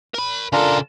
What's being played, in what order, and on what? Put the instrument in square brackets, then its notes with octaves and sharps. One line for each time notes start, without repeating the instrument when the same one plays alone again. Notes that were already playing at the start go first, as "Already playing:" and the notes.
[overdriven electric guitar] A#4 B5
[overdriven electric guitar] C#3 A4 [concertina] D4 F4 A#4